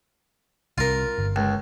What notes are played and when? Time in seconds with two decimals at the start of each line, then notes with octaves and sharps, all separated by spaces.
0.78 C2 C3 F4 A#4
1.19 G1
1.36 C#2